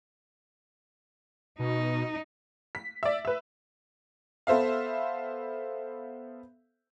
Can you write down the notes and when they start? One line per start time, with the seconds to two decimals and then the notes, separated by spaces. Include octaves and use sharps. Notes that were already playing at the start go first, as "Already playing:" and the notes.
1.59 B2 D#4
2.75 B6
3.03 D5 E5
3.25 B4 E5
4.47 B3 A4 C5 E5 F5